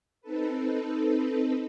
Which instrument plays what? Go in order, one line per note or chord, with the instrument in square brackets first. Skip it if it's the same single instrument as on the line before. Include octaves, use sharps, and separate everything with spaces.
[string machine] C4 D#4 A4 B4